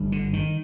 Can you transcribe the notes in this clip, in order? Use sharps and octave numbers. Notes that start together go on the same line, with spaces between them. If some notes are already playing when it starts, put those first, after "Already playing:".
Already playing: G1 G2
D3
D#3